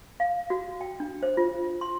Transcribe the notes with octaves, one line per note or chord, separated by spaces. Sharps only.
F5
F#4
G5
D4
C5
F4
C6